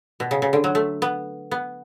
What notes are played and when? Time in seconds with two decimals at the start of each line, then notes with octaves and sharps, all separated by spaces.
0.20 B2
0.31 C#3
0.42 C#3
0.53 D3
0.64 F#3
0.75 A3
1.02 B3
1.51 B3